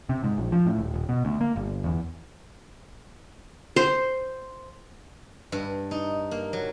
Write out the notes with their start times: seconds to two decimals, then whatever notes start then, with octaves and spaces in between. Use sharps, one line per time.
0.09 C3
0.24 G#2
0.38 A#1
0.52 F3
0.66 A2
0.79 D#1
0.94 D#1
1.09 B2
1.25 D2
1.41 A#3
1.56 G1
1.84 E2
3.76 C5
5.52 G2
5.91 D#4
6.31 A#3
6.53 F#3